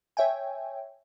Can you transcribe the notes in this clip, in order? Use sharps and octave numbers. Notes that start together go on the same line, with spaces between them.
C#5 E5 G5 G#5